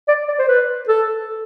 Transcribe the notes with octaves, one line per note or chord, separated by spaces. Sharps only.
D5
D5
C5
B4
A4